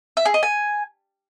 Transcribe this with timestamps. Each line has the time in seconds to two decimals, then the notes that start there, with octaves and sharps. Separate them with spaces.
0.17 E5
0.25 G#4
0.34 D#5
0.43 G#5